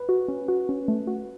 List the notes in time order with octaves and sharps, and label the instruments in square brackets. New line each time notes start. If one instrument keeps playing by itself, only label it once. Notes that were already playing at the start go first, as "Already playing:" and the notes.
Already playing: [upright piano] B4
[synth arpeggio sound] F#4
C#4
F#4
C#4
A3
F#4